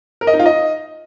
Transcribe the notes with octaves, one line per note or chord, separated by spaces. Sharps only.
A#4
D#5
D#4
F4
D#5